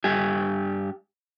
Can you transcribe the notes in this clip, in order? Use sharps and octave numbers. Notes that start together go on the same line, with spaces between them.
G2 G4 G#5